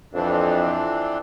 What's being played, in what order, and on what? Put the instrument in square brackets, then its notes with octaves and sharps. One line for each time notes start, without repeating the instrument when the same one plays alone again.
[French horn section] F2 [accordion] E3 C4 D4